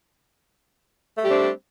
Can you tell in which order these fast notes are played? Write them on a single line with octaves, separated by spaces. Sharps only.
A3 G3 G4 C4 D4